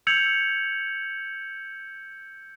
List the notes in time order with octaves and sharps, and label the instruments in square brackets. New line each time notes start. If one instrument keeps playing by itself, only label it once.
[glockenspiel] E6 G6 G#6 C#7 F7 F#7